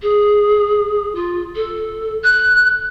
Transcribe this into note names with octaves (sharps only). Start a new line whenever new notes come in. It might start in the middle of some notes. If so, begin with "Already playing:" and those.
G#4
F4
A4
F#6